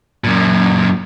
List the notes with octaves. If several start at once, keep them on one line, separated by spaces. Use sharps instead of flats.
F#2 A#2